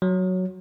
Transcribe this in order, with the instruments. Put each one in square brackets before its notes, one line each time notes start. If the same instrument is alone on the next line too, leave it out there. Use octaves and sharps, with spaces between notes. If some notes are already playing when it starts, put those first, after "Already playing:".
[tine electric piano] F#3